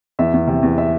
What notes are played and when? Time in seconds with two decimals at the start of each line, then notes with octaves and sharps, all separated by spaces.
0.19 E2 E5
0.33 E2
0.48 C3
0.63 E2
0.78 E5